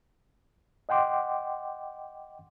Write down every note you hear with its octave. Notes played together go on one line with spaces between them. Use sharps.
D#5 F#5 G5 C6 D6